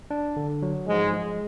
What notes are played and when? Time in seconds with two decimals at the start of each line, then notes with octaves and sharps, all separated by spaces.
0.11 D4
0.37 D3
0.62 F#3
0.88 G#2 F3 G#3
1.14 G#3